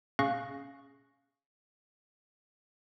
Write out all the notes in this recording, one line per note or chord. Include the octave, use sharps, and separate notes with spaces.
C#4 G#4 F5 C#6 F#6 A#6